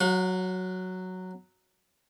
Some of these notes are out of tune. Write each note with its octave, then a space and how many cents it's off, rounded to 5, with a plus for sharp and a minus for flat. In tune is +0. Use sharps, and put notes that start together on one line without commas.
F#3 +0 F#5 -45